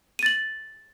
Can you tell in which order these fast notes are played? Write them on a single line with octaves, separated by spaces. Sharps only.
D#7 A6 F#7